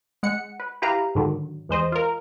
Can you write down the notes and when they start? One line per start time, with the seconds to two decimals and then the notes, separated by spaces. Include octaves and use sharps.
0.23 G#3 F#5 C#7
0.60 B4
0.82 E4 G4 B4 F5 A#5
1.15 G#2 D3 D#3 F#3
1.69 E2 G#3 C5 D#5
1.92 F4 A#4